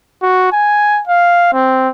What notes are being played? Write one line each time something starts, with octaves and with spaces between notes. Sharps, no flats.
F#4
G#5
F5
C4